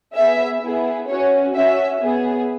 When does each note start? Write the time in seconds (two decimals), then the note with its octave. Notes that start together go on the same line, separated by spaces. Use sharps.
0.15 B3 G#4 E5
0.61 B3 E4 G#4
1.08 C#4 F#4 C#5
1.55 C#4 F#4 E5
2.01 B3 G#4